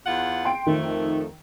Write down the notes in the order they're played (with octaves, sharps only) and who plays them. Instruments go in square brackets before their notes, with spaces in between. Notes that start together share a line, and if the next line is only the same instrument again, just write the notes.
[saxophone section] E2 F4 F#5
[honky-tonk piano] G5 C6 D7
[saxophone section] F2 A3 [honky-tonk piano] D#3